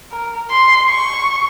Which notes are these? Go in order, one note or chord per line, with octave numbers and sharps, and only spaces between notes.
A#4
C6
C#6